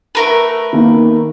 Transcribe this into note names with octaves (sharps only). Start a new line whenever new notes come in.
A3 A#4 B4
D#3 A#3 B3